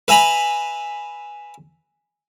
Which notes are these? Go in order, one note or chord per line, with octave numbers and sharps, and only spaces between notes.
B4 E5 G#5 A#5 B5